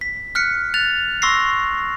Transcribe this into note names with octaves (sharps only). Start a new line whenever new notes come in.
B6
F6 F#6 B6 C#7
F#6 A6 F7
C6 C#6 E6 A#6 C7